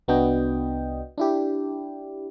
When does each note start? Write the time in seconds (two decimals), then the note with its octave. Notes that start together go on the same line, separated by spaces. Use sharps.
0.08 C2 B3 D4 F#4 D#5 G5
1.18 D4 E4 G4